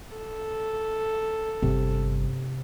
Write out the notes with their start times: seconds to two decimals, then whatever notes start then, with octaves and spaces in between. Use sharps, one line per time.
0.17 A4
1.63 G1 C3